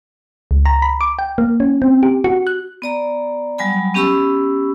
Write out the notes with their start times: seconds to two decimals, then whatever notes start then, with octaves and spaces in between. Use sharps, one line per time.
0.51 C#2
0.66 A#5
0.82 B5
1.01 D6
1.19 G5
1.38 A#3
1.60 C#4
1.82 C4
2.03 G4
2.24 F#4
2.47 F#6
2.82 B3 D5 A#5
3.58 F#3 G3 G#5 B5
3.94 B3 C#4 G4 B5 C#6 E6